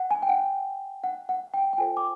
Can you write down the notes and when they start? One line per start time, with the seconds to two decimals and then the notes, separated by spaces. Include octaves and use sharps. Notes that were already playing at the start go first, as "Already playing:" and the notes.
Already playing: F#5
0.11 G#5
0.23 G5
0.29 F#5
1.04 F#5
1.29 F#5
1.54 G5
1.73 G5
1.78 F4 A4 C5 G#5
1.97 D6